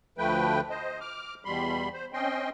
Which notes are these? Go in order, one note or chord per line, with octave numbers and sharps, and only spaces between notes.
D2 F3 A3 B4 G5
C5 D#5
D6 F6
E2 B2 G3 B5 C6
C5
C4 C#4 D#5 G5 C6